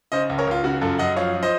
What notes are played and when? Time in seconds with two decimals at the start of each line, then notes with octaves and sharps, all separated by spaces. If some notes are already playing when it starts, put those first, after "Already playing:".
0.12 C#3 C5 D#5
0.29 C#2
0.38 A#4 C#5
0.47 C#2 F4
0.64 C#3 F#4
0.81 F#2 F4 A4
0.98 F#2 D#5 F#5
1.16 F3 C#5 F5
1.33 F3
1.43 C5 D#5